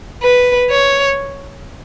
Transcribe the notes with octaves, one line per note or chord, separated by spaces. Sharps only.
B4
C#5